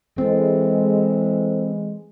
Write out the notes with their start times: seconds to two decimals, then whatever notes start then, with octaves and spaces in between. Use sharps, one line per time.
0.18 E3 G#3 C4 A4 C5